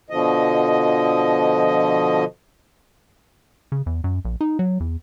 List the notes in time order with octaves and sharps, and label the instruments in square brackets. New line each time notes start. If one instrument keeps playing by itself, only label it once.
[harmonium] B2 D3 F3 D#5
[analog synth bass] C#3
E2
F#2
A#1
D#4
F#3
E2